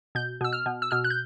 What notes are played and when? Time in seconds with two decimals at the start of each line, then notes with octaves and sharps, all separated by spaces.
0.15 B2 G6
0.41 B2 E6
0.53 F6
0.66 B2
0.82 E6
0.91 B2 F6
1.04 F#6
1.10 G6